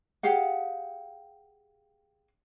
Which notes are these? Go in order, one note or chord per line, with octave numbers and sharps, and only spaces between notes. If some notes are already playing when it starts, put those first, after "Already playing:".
G4 G#4 F5 F#5